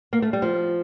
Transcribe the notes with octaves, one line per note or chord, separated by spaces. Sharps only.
A#3
A3
G3
F3